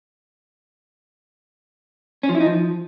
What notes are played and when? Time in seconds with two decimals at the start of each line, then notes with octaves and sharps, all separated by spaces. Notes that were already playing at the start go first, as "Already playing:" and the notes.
2.23 C#4
2.29 F3
2.35 E4
2.41 D#4
2.46 F3